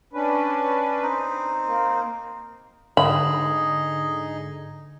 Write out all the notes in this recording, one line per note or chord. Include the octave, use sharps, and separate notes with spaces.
C#4 D4 B4
C4 D#4
A#3
G#2 D3 D#4 G#4 D#5 B5